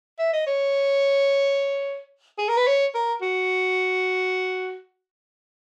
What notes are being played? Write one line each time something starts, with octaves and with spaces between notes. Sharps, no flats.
E5
D#5
C#5
G#4
A#4
B4
C#5
A#4
F#4